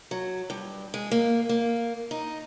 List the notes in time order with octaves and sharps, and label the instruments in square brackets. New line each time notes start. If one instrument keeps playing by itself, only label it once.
[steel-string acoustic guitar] F#3
G2
G#3
A#3
A#3
D#4